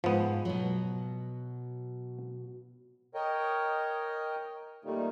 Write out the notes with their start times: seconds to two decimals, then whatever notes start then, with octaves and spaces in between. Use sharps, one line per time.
0.04 G#2 F3 B3
0.45 B2 F#3
3.14 A#4 C#5 D#5 G5
4.85 A#2 D#3 G3 A3 A#3 D#4